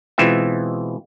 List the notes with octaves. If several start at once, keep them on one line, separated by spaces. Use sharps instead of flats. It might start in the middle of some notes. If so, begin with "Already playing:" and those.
B2 E3 G#3 C4 F4 E5